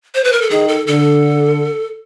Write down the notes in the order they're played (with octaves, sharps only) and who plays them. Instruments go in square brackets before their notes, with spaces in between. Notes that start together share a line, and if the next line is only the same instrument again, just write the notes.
[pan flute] C5
B4
A#4
A4
[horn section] D#3 [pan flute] G#4
[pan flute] A4
[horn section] D3 [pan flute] A4